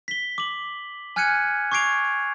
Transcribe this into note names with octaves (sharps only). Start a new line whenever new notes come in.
B6 G7
D6 F#7
G#5 F6 F#6 G#6 C#7 D#7
C#6 D6 G#6 C7 D7 F7